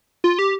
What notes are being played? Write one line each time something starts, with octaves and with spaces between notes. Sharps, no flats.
F4
G4